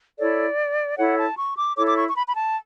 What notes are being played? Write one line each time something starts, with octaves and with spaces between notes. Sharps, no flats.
E4 A4 C#5 D5
E4 A4 C#5 F#5
A5
C#6
D6
E4 A4 C#5 D6
D6
C#6
C#6
B5
B5
A5